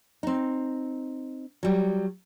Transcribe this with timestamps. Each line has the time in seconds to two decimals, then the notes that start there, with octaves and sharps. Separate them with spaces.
0.23 C4 D#4
1.63 F#3 G3